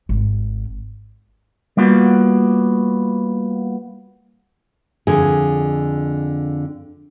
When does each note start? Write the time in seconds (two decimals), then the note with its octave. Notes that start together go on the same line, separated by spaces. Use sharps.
0.09 G#1
1.77 G3 A#3 B3 F4 F#4
5.07 F2 D3 G#4